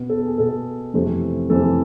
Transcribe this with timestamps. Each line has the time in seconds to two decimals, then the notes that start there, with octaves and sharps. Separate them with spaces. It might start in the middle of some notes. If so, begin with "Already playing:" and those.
Already playing: B2 B3
0.09 A4
0.26 G#4
0.38 B2 B3 A4
0.93 F2 C3 E3 A3
1.50 F2 C3 E3 A3 A4